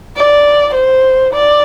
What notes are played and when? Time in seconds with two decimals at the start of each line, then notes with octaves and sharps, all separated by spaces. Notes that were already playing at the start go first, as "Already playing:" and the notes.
0.17 D5
0.75 C5
1.34 D5